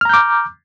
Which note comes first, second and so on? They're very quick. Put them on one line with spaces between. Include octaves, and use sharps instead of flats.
F6 A#5 G6 D6